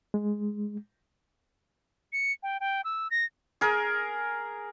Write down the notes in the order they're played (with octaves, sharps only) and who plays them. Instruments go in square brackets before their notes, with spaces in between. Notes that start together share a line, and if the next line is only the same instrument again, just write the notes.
[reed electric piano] G#3
[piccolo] C#7
G5
G5
E6
A#6
[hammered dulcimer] G#4 A#4